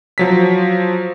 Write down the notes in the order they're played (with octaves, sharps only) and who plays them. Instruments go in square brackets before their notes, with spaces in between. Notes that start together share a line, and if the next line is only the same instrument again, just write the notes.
[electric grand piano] F3 F#3 B6